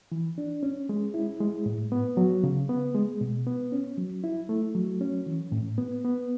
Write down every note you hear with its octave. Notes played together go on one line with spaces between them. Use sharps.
E3
D4
C#4
G#3
E4
G#3
A2
B3
F#3
C#3
B3
G#3
B2
B3
C#4
F#3
E4
A3
F#3
C#4
E3
A2
B3
B3